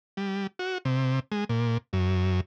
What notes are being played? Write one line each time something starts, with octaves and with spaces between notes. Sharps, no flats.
G3
F#4
C3
G#3
A#2
F#2